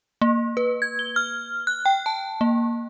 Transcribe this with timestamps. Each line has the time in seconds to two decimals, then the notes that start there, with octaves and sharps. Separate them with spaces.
0.21 A#3
0.57 B4
0.82 G#6
0.99 G7
1.16 F6
1.67 F#6
1.86 G5
2.06 A5
2.41 A#3